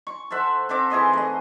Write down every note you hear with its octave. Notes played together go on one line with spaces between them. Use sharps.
C#6
A4 C5 E5 F#5
C4 A4 E5 D6
E3 G#4 D#5 C6
A3 D#5